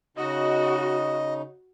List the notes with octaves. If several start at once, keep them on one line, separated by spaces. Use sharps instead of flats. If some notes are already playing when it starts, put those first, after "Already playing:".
C#3 D#4 F#4 D#5